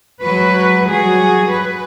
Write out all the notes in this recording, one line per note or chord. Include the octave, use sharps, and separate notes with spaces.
F#3 G#3 F#4 B4
F#3 G3 F#4 G#4
B4